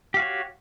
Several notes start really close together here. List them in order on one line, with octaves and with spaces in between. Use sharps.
G4 F5 F#4 C#5